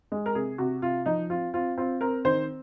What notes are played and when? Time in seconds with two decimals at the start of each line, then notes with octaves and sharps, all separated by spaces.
0.12 G#3
0.26 A#4
0.35 C3 G#4
0.58 C3 F#4
0.82 C3 F4
1.06 F3 D#4
1.30 C4 F4
1.54 C4 F4
1.78 C4 F4
2.01 C4 A#4
2.25 D#3 C5